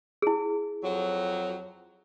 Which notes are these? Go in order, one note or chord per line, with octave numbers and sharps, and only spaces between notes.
E4 G#4
F2 F#3